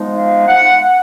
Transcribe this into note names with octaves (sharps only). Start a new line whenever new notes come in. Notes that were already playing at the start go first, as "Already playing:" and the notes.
Already playing: F3 G#3 B3 D#4
F5
F#5
F#5